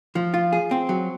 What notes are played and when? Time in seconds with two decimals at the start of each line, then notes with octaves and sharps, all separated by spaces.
0.15 F3
0.34 F4
0.53 G#4
0.71 C4
0.89 F#3